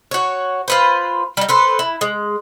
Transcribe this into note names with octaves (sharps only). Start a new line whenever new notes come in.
F#4 C#5
F4 B4 C5
G3 D#4
A4 B4 C5
E4
G#3